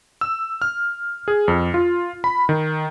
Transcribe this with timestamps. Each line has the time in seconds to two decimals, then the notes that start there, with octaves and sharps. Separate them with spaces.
0.21 E6
0.62 F6
1.28 G#4
1.48 F2
1.74 F4
2.24 B5
2.49 D#3